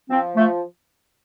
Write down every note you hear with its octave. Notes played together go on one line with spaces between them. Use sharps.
F3 C4
F3 A3